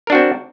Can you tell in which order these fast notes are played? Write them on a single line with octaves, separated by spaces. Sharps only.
A#4 D4 F#4 C4